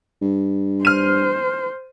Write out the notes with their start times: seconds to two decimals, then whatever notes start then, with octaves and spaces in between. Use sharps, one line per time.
0.22 G2
0.85 C5 F6 D#7